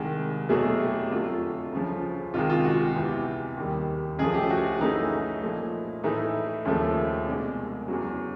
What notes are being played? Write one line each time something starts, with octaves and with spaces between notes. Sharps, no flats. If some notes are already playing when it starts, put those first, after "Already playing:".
Already playing: C2 C3 D#3 G#3
E2 B2 F#3 A3 G#4
G4
F2 D3 F#3 A3 F4
D2 C#3 F3
C#2 C3 D#3 G#3 F4
F4
F#4
G4
E2 C3 E3
D#2 D#3 G3
C#2 C#3 F3 A3 G#4
G4
F#4
F#2 C#3 E3 A3 D#4
A#2 F3 A3
A2 E3 A3 D#4
D#2 C#3 F3 A3
C2 B2 G#3 D4
E2 C#3 F#3